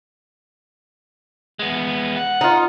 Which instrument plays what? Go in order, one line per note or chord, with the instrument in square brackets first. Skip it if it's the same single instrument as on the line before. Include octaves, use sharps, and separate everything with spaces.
[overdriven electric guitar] G#3 B3
F#5
[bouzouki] D#4 F4